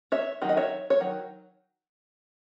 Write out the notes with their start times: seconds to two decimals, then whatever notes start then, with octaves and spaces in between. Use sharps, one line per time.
0.12 C#5 E5
0.42 D#3 F#3
0.49 D#5
0.57 C#5 E5
0.90 C#5
1.00 D#3 F#3